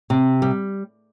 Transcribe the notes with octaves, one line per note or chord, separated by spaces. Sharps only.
C3
G3